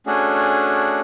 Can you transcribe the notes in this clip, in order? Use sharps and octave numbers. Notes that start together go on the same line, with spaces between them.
A3 C#4 D4 F#4 G#4